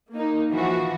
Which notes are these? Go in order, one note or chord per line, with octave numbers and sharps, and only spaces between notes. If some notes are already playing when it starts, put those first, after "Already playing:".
A#3 D#4
E3 F3 F#4